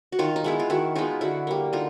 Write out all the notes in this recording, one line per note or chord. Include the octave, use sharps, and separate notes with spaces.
F#4
D#3 D#4 F4
D#4
G#3 B3 E4
F4
D#3 E4 F#4
G#3 B3 D#4 F4
D3 E4 F#4
G3 A#3
D3 D#4 F4